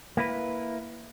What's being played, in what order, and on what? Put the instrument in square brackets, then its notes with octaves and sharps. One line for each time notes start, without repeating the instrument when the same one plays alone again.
[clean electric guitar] A#3 E4 B4